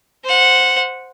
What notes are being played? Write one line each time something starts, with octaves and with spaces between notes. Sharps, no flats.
C5 F#5